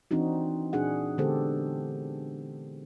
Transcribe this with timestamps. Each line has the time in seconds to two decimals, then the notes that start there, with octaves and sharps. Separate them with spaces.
0.11 E3 C4 D4 D#4 F#4
0.73 A#2 D4 F#4 G#4 F#5
1.18 D3 G#3 B3 G4 A4 C5